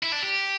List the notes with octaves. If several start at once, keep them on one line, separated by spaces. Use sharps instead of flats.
E4
D4
G4